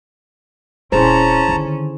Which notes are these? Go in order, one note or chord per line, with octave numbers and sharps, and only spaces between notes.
D#1 C#4 E4 G#4 C5 A5 A#5
D3 D#3